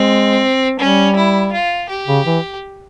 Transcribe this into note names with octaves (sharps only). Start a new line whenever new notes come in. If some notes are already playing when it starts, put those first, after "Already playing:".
Already playing: G#3 C4
G3 C#4
E4
F4
G4
C#3
E3